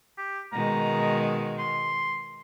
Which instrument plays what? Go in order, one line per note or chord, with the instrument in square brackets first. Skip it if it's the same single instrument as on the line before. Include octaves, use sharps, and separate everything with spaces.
[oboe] G4
[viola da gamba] B2 D#3 G#3 [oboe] A#5
[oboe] C6